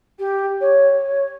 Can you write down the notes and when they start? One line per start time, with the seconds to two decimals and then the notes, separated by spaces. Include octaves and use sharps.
0.19 G4
0.61 C#5